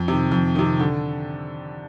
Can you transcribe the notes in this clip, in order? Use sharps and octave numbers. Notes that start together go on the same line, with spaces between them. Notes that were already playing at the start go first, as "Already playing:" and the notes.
Already playing: F2
C3 D#3
F2
C3 D#3
D3